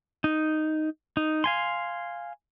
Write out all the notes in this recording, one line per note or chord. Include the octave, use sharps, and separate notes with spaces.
D#4
D#4
F5 G#5 C6